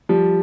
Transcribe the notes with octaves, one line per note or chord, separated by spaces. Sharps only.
F3 G3